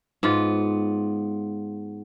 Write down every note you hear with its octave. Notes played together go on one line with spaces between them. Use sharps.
G#2 B3 F4